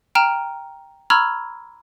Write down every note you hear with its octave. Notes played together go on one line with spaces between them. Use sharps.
G5 A#5 F6 D7 E7
A#5 B5 C#6 E6 F6 G#6